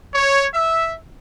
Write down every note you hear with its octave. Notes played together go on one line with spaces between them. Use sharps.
C#5
E5